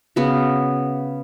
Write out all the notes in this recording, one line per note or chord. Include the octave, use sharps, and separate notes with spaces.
C#3 B3 F#4